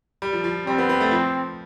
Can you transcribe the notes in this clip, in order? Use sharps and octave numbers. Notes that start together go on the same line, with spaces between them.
G3
F3
F3
G3 C4
B3
B3
A3
F3